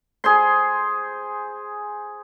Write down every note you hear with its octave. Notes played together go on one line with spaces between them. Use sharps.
G#4 C5 C6